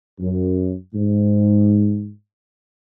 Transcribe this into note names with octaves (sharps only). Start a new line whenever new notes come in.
F#2
G#2